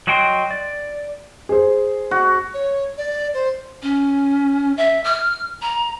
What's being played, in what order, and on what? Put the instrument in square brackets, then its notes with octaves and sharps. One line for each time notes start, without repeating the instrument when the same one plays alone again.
[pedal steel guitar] F#3 F#4 D#5 G5 C6
D5
[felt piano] G#4 C5
[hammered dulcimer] F#4
[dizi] C#5
D5
C5
[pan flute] C#4
E5
F6
A#5